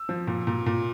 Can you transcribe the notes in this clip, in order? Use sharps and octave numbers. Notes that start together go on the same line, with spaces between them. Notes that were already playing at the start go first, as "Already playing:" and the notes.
Already playing: E6
F3
A#2
A#2
A#2